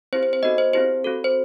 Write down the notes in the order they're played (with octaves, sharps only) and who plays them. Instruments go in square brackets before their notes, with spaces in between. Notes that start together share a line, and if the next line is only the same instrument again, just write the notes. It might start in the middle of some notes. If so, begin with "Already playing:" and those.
[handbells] C4 E4 G4 C5
C5
C5
B3 D#4 F#4 A4 D#5
C5
C4 E4 G4 C5
C4 F#4 A4
C5